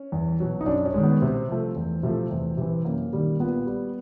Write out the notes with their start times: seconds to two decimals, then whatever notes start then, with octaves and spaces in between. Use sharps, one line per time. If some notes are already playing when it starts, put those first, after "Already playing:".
Already playing: C#4
0.12 E2
0.40 B2 F#3
0.61 D#4
0.66 F#2 D4
0.86 C#4
0.94 D#3 G#3
1.03 B3
1.21 C3 C4
1.49 F3 A3
1.76 E2
2.03 C3 F3 A3
2.31 E2
2.57 C3 E3
2.85 F#2 A#3
3.13 D#3 G3
3.40 A#2 B3
3.66 G3